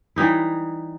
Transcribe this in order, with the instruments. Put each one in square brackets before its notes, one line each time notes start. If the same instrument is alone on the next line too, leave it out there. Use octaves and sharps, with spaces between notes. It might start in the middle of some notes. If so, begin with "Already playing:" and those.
[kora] E3 G3 D#4 E4